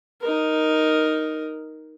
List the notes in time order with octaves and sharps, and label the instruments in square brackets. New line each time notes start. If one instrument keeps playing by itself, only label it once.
[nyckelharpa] D#4 A#4